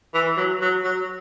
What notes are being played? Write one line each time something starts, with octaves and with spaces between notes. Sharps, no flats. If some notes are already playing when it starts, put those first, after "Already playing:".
E3
F#3
F#3
F#3